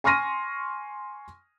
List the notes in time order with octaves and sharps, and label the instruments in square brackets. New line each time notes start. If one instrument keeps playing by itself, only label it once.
[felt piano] G#5 C6 C#6 F6 A#6 D#7